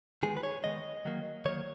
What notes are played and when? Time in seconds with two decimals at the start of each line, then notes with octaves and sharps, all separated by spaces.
0.23 D#3 G#3 B3 G#4
0.37 B4
0.43 C#5
0.64 D#3 G#3 B3 D#5
1.05 D#3 F#3 A#3
1.45 D#3 F#3 A#3 C#5